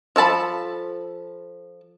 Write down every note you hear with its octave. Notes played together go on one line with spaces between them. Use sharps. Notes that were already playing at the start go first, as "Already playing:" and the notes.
F3 A4 A5 B5